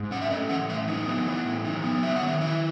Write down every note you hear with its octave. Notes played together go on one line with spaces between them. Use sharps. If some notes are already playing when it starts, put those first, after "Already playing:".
Already playing: G#2
C#4 F#5
E5
A3 D#5
E3 F#5
A2 E5
D#4
B3
E3
A2
D#4
B3
F#3 E5
F#5
D#3
E5
E4 E5